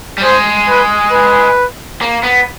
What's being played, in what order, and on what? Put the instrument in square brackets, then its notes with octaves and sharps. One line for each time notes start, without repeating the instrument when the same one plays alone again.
[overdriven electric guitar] G3
[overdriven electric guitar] G#3 [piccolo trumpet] C5
[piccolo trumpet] B4
B4
[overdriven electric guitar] A#3
B3